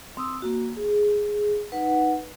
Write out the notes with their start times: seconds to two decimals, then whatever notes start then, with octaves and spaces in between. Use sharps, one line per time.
0.17 C4 D#6 E6
0.42 A#3 F#4
0.77 G#4
1.72 D#4 B4 F#5